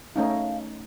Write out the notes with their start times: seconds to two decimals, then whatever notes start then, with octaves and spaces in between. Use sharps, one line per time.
0.16 A3 C#4 D#4 F5